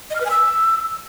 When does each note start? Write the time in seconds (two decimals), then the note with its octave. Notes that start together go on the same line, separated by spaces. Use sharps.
0.10 D#5
0.15 F6
0.20 B4
0.25 G#5
0.30 E6